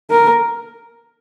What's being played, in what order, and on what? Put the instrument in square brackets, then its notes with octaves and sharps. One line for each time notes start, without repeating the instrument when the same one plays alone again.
[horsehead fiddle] A#4